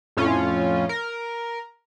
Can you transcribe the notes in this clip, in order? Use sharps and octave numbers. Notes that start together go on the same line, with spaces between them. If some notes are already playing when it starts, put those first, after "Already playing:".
F2 A2 C#4 F4
A#4